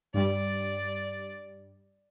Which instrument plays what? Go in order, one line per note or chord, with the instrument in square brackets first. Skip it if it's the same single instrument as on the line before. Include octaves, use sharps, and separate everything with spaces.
[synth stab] G2 G3 [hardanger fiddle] D5